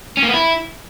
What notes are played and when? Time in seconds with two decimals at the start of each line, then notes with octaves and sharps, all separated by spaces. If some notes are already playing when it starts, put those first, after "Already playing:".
0.17 C#4
0.22 A#3
0.28 B3
0.33 E4